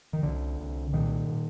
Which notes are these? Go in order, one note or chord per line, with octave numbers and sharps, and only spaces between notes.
D#3
C2 D3
C2
A#2 D#3
A#2